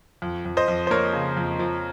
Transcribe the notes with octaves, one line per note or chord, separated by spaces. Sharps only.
F2
F2
C5 D#5
F2
C5
A#3 A#4 C#5
C#3
F2
F3